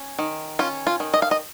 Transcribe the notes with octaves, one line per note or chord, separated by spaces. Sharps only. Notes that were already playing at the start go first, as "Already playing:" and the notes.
Already playing: C#4
D#3
C#4 F4
F4
D#3
D#5
F5
D#5